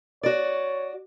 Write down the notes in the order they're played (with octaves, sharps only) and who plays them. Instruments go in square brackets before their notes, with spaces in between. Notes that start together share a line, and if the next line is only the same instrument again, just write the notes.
[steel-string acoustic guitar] F#4 D5 [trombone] C#5